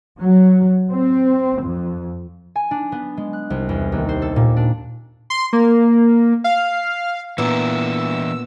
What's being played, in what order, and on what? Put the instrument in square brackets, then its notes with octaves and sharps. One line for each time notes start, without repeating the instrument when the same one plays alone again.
[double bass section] F#3
C4
F2
[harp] G#5
D4
B3
G#3
F#6
C2
E2
D#2
C5
A4
A#2
D4
[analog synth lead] C6
A#3
F5
[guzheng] A#2 [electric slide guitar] E3 D4 E4 [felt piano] B3 [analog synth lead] E6